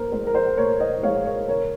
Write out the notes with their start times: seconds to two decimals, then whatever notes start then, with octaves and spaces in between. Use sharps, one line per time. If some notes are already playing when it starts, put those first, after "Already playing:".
Already playing: A#2 A#4 C5
0.12 G#3 C5
0.27 A#4
0.34 C5
0.57 A#2 A#4 C#5
0.80 C5 D#5
1.03 G#3 C#5 F5
1.25 A#4 C#5
1.48 C#3 A#4 C#5